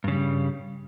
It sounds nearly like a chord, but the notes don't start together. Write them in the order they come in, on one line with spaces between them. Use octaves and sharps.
G2 C#3 G3